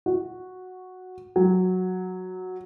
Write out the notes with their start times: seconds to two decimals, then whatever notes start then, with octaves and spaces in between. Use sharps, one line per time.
0.06 F#4
1.36 F#3